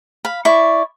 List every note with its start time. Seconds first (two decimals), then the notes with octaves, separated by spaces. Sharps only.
0.25 F5 B5
0.45 E4 D5 C#6